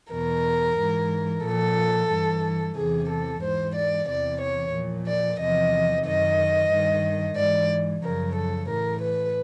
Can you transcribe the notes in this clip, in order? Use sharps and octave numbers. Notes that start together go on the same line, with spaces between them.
E2 B2 A#4
G#2 E3
A#2 F3 A4
G2 E3
E2 C3 E3 G#4
A4
G#2 E3 C5
D5
E2 C3 E3 D5
C#5
A#2 F3
D5
E2 C3 F3 D#5
F#2 D#3 D#5
G2 D#3
G#2 E3 D5
F#2 C#3 F3 A#4
A4
A2 E3 A#4
B4